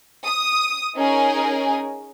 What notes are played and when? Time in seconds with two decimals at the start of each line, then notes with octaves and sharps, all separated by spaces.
0.24 D#6
0.95 C#4 D#4 G#4 A#4 G#5